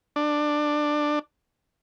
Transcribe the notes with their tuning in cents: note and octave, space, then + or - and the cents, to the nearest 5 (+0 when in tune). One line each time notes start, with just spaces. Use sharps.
D4 +15